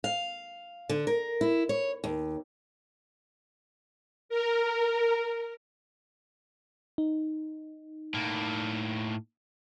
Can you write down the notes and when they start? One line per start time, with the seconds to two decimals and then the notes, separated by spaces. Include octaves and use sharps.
0.04 F5
0.89 D3
1.07 A#4
1.41 E4
1.69 C#5
2.04 D#2
4.29 A#4
6.98 D#4
8.14 A2 A#3